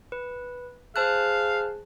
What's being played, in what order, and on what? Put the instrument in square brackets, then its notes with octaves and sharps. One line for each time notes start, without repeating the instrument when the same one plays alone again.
[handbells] B4
[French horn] G#4 [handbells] C5 A5 F#6 [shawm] F5